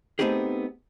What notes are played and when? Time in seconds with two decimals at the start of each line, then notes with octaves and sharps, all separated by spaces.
0.19 A3 B3 C4 D#4 G4 G#4